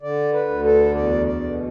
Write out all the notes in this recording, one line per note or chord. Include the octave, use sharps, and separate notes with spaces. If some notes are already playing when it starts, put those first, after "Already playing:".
D3 D5
B4
D2
A4
E2 D5
D5
B2